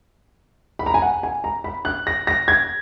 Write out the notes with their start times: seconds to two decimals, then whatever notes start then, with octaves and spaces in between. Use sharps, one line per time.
0.79 B5
0.86 A#5
0.94 G#5
1.02 F#5
1.23 G#5
1.44 A#5
1.64 B5
1.85 F#6
2.07 A#6
2.27 A#6
2.48 G#6